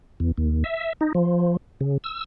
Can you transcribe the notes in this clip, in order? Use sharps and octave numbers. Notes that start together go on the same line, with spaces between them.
E2
D#2
E5
D#4
F3
C#3
E6